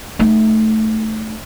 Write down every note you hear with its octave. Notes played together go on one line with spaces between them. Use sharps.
A3 D#4